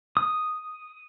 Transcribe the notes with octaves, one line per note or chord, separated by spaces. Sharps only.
D#6